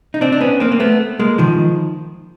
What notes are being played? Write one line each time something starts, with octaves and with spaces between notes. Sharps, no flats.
D#4
C4 D4
D4
B3 C#4
A#3 C4
A#3
A3 B3
G#3 A#3
D#3 F3